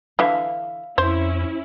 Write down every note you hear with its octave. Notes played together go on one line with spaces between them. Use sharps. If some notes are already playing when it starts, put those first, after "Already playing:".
D3 E3 E5 F5
F2 C#4 E4 C5